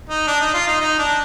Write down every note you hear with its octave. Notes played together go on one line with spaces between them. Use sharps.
D#4
D4
D#4
F4
D#4
D#4
D4